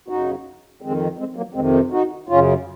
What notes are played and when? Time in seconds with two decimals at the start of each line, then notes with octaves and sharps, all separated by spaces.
0.08 F#2 C#3 D#4 F#4
0.81 F2 D#3 G#3 C4
1.19 G#3 C4
1.36 F#3 A#3
1.54 F2 C3 D#3 G#3 C4
1.73 C4 D#4
1.91 D#4 F#4
2.29 F#2 C#3 C#4 F4